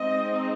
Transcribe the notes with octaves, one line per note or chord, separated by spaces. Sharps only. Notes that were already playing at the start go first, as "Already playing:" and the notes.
Already playing: G#3 C4 D#4 D#5